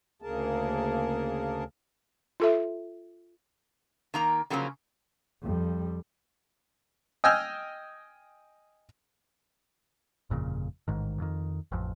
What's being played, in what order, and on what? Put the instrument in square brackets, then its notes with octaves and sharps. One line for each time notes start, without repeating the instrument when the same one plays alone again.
[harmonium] D2 C#3 A#3 G#4 A#4 A5
[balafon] F4 A4 E5
[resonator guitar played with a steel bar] D#3 A#3 A#5
C#3 F3 F#3 A#3 B3 C#4
[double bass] F2 G3
[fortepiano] D#5 G5 G#5 E6 F6
[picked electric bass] G1 F2 A#2 C#3
A1 G#2 D#3
F2 D#3
A1 F2